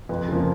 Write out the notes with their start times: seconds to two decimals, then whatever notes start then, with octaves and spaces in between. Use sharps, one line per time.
0.09 F2 B4
0.28 C#3 F3 A#3